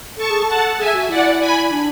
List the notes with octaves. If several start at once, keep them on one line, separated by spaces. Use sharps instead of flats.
A4 A5 C#6
G#4
A4 F#5 A5
G#4 E5 G#5
F#4
E4 D5 F#5
G#5 B5
D4